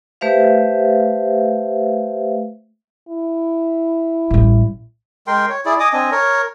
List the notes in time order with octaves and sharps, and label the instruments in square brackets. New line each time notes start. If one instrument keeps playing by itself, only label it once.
[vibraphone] A3 G4 B4 C5 E5 F5
[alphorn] E4
[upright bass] A1 G3
[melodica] G#3 A#4 G5 C6
C#5
E4 G#4 D5
D#5 G#5 D6 D#6
C4 D4 D#5 G#5
A#4 C#5